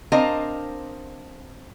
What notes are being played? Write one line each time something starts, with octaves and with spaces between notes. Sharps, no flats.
C4 D4 A#4 C5 D#5 F5